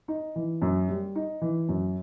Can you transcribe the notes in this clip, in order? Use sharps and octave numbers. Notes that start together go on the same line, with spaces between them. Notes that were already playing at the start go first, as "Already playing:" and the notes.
D#4
E3
F#2
G3
D#4
E3
F#2